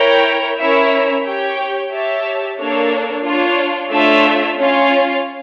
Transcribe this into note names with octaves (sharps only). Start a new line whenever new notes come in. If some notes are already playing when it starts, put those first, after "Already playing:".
Already playing: E4 A#4 C#5 G5
C#4 E4 A#4 C#5 E5
G4 C#5 G5
G4 C#5 E5 A5
A#3 D4 A4 C#5
D4 F4 C#5
A3 D4 F4 C#5 E5
C#4 F4 C#5 F5